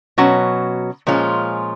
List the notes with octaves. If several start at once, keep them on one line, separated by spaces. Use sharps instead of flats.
B2 F#3 C#4 F#4
A#2 F3 G#3 C#4 F4